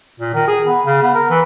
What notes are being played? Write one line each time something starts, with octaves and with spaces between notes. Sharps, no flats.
A#2
D#3
G#4
B3
C#3
B3
A#4
E3